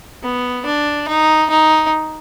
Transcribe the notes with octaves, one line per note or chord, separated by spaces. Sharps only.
B3
D4
D#4
D#4